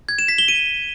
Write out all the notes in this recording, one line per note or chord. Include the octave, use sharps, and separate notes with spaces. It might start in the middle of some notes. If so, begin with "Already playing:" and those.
G#6
E7
B6
G7
D#7